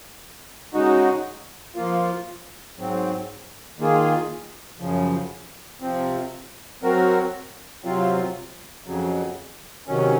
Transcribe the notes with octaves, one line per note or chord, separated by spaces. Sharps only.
C#3 G#3 D#4 F#4
F3 A#3 F4
G#2 F#3 C4
D#3 A#3 F4 G#4
F#2 C#3 F3
C3 F3 C4
F#3 C4 F#4 A#4
C3 F#3 C4 F4
F2 C#3 F#3
C3 D#3 F#3 C#4